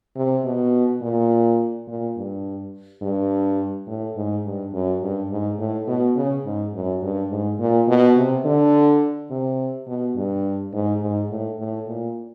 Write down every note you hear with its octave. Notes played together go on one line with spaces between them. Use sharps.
C3
B2
A#2
A#2
G2
G2
A2
G#2
G2
F#2
G2
G#2
A2
B2
C#3
G#2
F#2
G2
G#2
A#2
B2
C3
D3
C3
B2
G2
G#2
G#2
A2
A2
A#2